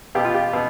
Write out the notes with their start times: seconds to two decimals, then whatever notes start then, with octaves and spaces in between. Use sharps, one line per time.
0.15 B2 G4
0.25 F4
0.34 G4
0.53 B2